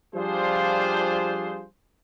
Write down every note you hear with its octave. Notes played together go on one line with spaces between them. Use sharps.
F3 G3 D4 F4 G#4 C5